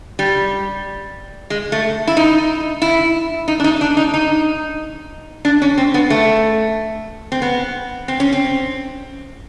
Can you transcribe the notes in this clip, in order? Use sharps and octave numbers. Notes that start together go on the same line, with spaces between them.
G3
G#3
A3
E4
D#4
E4
D#4
D4
D#4
D4
D#4
D#4
D4
C#4
C4
B3
A3
C4
B3
C4
C#4
C4